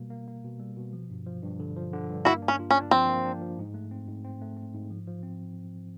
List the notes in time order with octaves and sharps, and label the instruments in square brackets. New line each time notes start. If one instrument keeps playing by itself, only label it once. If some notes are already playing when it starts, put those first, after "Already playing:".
Already playing: [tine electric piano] B2 G3 A#3
A#3
A#3
B2
G3
B2
F3
G2
F3
G2
D3
F3
D3
G2
[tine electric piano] A#3 [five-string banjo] E4 F#4
[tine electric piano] D4
[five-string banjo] C#4
[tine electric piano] F4
[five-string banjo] C#4
[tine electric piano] D4
[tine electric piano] F3 [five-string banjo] C4
[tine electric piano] A#3
D4
F3
G#2
A3
C4
G#2
C4
A3
C4
G#2
F3
F3
C4